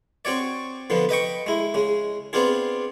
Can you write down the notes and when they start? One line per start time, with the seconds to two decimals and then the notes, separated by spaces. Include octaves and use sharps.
0.25 C4 F#4 C#5 D5
0.90 D3 F3 B3
1.09 B4 D#5 G5 C#6
1.46 G#3 E4
1.74 C#3 G#3
2.33 B3 C4 D4 F4 G#4